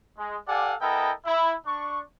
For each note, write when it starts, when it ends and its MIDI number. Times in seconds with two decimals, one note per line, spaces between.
0.19 0.37 56
0.48 0.75 67
0.48 0.75 69
0.48 0.75 74
0.48 0.75 77
0.48 0.75 78
0.48 0.75 80
0.82 1.12 59
0.82 1.12 64
0.82 1.12 69
0.82 1.12 70
0.82 1.12 75
0.82 1.12 79
1.26 1.54 64
1.67 2.01 62
1.67 2.01 85